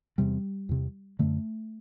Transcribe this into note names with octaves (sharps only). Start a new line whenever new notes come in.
E2 C3 G3
E2 C3
F#2 D3 A3